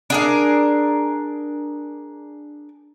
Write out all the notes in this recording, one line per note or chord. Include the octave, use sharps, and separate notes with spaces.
D4 G#4 A#4